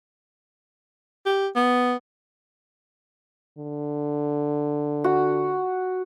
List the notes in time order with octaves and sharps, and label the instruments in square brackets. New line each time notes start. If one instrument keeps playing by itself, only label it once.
[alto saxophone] G4
B3
[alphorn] D3
[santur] F#4